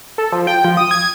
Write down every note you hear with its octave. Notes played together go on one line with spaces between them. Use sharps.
A4
F3
G5
F3
D#6
G#6